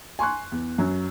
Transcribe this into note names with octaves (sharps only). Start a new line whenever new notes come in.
G#5 C6 C#6 F#6
E2
F#2 F#3